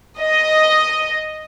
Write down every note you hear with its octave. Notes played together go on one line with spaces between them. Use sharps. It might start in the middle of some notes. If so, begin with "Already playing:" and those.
D#5